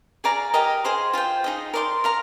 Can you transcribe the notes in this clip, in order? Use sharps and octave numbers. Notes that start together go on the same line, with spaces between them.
G#4 D5 F5 A#5
G4 A#4 D#5 A#5
G#4 C5 F5 C6
F4 C5 G5
D#4 G#4 D#5
A#4 D5 F5 C6
A#4 F5 A#5